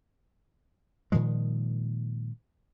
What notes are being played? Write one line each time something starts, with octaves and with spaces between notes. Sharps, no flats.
A#2 D#3 F3 G#3